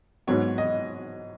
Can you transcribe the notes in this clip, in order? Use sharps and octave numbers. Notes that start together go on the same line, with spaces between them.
G#2 F#3 B3 C#5
D#5